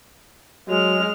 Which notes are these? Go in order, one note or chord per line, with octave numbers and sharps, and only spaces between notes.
F#3 G#3 F6